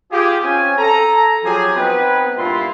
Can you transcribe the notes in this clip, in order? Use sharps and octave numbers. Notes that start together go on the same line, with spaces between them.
F4 G4 G#4
C4 C#4 F5 G#5
A4 A#5
F3 F#3 C4 G4 G#4 G#5
B3 C4 D#4 B4
G2 A#2 E4 F4 C6